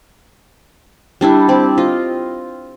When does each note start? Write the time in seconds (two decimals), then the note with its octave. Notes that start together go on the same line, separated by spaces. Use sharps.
1.21 G3 D4 E4 G4
1.48 C4 G4 D5
1.78 F4 D#5